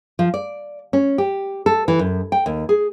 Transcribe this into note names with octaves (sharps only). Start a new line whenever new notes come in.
F3
D5
C#4
G4
A4
E3
F#2
G5
D#2
G#4